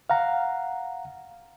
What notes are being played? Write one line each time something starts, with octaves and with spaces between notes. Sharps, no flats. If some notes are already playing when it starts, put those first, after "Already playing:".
F5 F#5 A#5